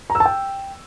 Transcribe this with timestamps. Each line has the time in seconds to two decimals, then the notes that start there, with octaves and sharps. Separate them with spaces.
0.10 A#5
0.15 E6
0.20 A5
0.25 G5